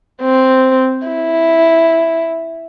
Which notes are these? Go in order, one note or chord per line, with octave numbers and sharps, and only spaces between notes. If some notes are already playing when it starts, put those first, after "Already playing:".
C4
E4